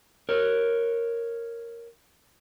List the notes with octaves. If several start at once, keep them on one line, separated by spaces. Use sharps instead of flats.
A#4 C#5